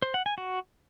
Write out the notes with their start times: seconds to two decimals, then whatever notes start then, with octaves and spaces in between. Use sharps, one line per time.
0.02 C5
0.14 F#5
0.26 G#5
0.38 F#4